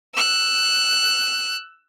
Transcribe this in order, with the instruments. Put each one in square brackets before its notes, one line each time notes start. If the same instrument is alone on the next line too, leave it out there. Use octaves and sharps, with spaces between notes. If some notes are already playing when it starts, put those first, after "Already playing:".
[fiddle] E6 F#6